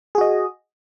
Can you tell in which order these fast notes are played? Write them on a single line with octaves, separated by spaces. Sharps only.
G#4 F#4 D#5